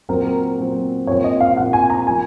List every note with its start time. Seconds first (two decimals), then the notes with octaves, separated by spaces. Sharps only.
0.09 A#2 F#3 C4 A#4
0.58 A#2 F#3 C4
1.07 A#2 F3 C4 C#5
1.24 D#5
1.40 F5
1.57 A#2 F3 C4 F#5
1.73 G#5
1.90 A#5
2.06 F3 A#3 F4 G#5